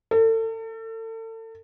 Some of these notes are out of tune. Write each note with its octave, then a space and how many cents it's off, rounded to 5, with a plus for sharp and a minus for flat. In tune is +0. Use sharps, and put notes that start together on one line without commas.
A4 +35